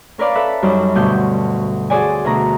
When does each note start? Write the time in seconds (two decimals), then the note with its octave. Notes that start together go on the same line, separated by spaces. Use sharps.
0.18 C#4 A#4 B4 D5 F5
0.35 A4 B4 E5
0.63 F#2 G3 D#4 C5
0.95 D2 G2 B2 C6 G6
1.90 F#4 G#4 C5 D5 G#5
2.25 D2 B2 A#5